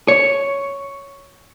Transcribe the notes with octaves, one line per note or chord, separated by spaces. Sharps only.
C#5